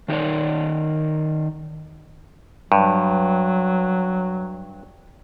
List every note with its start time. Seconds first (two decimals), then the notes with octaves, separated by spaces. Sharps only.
0.08 D#3 D#4 G4 A4 C#5 D5
2.72 G2 F#3